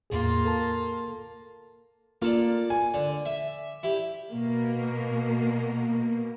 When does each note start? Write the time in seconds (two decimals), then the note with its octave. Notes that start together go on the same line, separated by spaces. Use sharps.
0.10 E2 A2 A#3 F4 G#4
0.45 A4 A#4 A5
2.22 A#3 F4 A4 D5
2.70 G#5
2.94 D3 D5
3.26 E5
3.83 E4 G4
4.32 B2 A#3